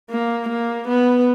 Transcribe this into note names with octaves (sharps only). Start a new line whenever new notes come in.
A#3
A#3
B3